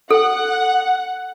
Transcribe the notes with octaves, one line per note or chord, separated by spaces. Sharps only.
A4 F#5